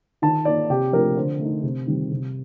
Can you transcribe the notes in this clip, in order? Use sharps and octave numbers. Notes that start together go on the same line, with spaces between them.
D#3 A5
A#3 D#4 D5
C3 G4
F3 A3 D4 F4 A#4
D3 C5
A3
D#4
C3
D#3 G3 C4
C3